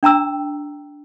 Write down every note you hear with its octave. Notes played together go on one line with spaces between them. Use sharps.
D4 G5 A#5 E6